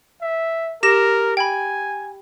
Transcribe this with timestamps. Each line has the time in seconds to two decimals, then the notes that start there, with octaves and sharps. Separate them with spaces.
0.21 E5
0.83 G4 A#4 A#6 E7
1.37 G5 G#5 B5